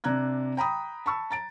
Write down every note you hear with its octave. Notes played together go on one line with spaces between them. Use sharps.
C3 D4 A#5 F#6 G#6
G5 A#5 B5 D#6
A5 B5 C#6 E6
A#5 A6 D7